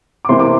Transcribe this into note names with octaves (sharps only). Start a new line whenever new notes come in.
D6
C3 E3 A#3 E4 C6
D6